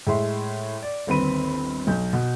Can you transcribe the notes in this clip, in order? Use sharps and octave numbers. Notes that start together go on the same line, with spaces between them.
A2 G#3 E5 C6
D5
G1 D#2 C4 B4 B5 D#7
B1 G6
B2